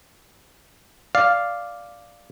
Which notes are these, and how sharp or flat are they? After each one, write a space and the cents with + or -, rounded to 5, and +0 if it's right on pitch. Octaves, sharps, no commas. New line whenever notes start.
D5 +0 F5 +0